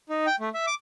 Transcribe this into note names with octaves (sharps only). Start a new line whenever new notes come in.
D#4
G5
A3
E5
D6